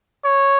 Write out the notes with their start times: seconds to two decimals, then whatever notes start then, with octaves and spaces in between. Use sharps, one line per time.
0.25 C#5